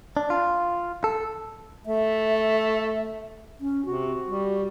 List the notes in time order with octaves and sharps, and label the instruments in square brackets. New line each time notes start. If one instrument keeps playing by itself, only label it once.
[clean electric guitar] D4
F4
A4
[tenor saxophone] A3 [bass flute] E5
[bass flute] C#4
[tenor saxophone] C3 [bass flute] F#4
[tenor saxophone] G3